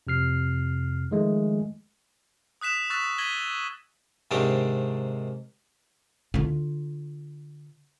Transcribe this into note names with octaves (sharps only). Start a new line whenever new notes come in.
F2 C3 F6 C7
D#3 F3 G#3 A3
D#6 F#6 B6 E7
C#6 E6 F#6 A6 B6
G#6 A#6 B6 D#7 F#7 G7
G#2 C3 D#3 C4 D4 G4
D3 F4